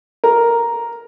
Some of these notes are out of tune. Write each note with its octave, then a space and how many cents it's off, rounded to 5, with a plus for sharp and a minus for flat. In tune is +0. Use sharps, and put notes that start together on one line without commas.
A#4 +5